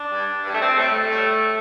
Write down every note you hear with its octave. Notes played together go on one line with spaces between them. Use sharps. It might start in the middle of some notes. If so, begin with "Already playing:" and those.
Already playing: D4
G2 G3
G2 G3
A3
C4
A2 G3 A3
A2 G3